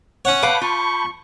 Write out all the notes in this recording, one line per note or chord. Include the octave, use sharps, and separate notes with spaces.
C#4 C#5 F#5
B4 C#5 F5 A5 B5 D6 G6
F4 C#6